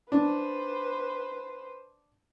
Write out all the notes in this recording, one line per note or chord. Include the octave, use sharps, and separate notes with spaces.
D4 B4 C5